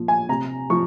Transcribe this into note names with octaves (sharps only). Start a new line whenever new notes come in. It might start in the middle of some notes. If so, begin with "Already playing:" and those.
Already playing: A#2 F3
G#5
C3 A#5
F3 C#6